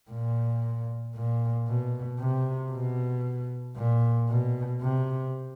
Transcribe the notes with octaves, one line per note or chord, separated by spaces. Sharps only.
A#2
A#2
B2
C3
B2
A#2
B2
C3